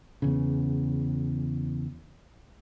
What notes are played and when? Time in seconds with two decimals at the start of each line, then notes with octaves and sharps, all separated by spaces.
0.22 E2 C#3